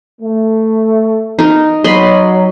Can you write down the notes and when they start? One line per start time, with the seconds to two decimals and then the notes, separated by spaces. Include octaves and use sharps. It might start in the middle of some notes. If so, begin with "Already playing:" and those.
0.21 A3
1.39 D#4 A#4
1.84 F#3 D#5 B5 C6